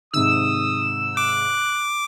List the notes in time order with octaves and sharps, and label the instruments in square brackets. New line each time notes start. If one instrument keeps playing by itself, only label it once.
[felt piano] G#2 C3 D#3 [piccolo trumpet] D#6 [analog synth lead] E6
[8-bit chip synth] D6 [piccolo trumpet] F#6